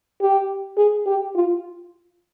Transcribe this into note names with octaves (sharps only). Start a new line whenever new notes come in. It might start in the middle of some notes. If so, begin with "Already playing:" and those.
G4
G#4
G4
F4